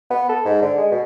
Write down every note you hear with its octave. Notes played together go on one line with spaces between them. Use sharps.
B3
A4
G#2
D3
G#3
B2